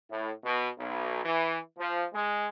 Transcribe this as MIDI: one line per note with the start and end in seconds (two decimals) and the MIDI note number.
0.11 0.31 45
0.44 0.69 47
0.78 1.23 35
1.24 1.58 52
1.78 2.05 53
2.13 2.47 56